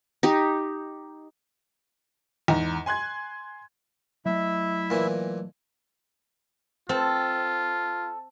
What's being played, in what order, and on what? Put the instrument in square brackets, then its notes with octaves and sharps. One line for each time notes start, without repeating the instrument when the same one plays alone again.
[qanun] D#4 G4
[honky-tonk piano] E2 G#2 A#5
G#5 C6 F#6 G#6
[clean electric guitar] F#3 A3 D#5 [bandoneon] E4 E5
[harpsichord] A#2 E3
[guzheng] C4 [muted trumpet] F4 [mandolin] A4